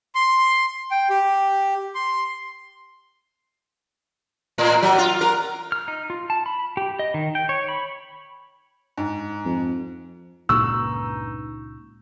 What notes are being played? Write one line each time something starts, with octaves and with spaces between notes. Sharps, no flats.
C6
G5
G4
C6
A2
F#3
F4
A#4
F6
D#4
F4
A5
B5
G4
D#5
D#3
G5
C#5
B5
G#2
F2
C#2 G2 A#2 A#3 D#4 C#6 E6